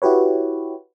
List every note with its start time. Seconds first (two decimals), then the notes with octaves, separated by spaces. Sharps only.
0.02 E4 F#4 G4 B4 C#5